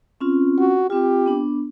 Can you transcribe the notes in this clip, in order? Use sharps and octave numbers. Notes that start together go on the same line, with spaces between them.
C4 C#4 F4
F#4
C4 F4 G4
B3 D4